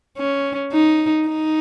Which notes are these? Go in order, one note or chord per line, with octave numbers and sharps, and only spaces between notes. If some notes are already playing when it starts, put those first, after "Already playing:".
C#4
D#4
D#4